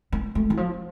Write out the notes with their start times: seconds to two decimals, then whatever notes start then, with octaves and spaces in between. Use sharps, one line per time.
0.12 B3
0.35 A3
0.50 E3
0.57 F3